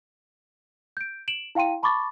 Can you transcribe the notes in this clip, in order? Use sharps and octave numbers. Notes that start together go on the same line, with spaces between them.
G6 D7
D7 E7 F#7
E4 F5 G5 C6 D#7
A5 B5 C#6 D6 A6